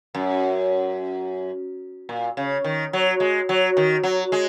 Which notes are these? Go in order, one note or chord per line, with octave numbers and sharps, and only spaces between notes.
F#2
A#2
C#3
D#3
F#3
G#3
F#3
D#3
F#3
G#3